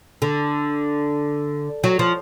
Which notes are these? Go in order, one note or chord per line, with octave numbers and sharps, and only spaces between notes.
D3
F#3
F3